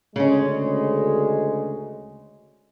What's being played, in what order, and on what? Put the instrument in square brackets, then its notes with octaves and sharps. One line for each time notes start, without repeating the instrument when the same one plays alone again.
[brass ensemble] D2 G#3 [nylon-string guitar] C#3 C#4